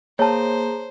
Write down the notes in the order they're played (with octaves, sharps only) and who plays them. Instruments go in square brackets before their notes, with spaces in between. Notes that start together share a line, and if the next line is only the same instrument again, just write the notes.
[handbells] A#3 [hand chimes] G#4 A#5 [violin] C5 [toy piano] C#5 A5